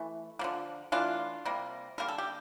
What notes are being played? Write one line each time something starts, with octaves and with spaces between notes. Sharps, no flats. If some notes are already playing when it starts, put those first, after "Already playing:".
Already playing: E3 A3
D3 F3 A#3
E3 A3 D4 F4
C3 G3 A#3
D3 G3 A#3 A#4
A4
G4